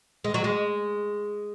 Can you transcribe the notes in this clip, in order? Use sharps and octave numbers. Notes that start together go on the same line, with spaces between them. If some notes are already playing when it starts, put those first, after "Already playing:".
G#3
F#3
G#3